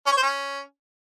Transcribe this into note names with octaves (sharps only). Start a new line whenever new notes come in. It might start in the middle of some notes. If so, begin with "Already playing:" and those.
C#4
C#5
C5
C#4